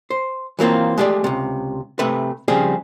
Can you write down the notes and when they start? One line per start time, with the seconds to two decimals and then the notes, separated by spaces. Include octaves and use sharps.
0.10 C5
0.59 E3 F#3 A#3 C4 F4
0.98 G#3 A3 G4 G#4 D5
1.24 C#2 C3
1.99 C3 A3 B4
2.48 C#3 F3 G3 C4 G#4